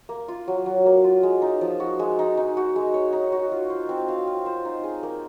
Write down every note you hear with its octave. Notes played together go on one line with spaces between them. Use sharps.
A#3
F4
F#3
F#3
A#3
F4
G#3
D#4
F3
F#4
G#3
D#4
D#4
F#4
G#3
C#5
D#4
F#4
F4
C5
C4
F5
F4
C5
D#4
G#4
A#3